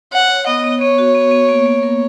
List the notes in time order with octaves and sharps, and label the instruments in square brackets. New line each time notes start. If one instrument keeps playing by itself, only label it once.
[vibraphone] C#5 [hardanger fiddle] F#5
[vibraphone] C#5
[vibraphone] B3 [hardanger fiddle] D#5
[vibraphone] B3
[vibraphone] B3 [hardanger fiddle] C#5
[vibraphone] F#4
B3
B3
A#3
A#3
A#4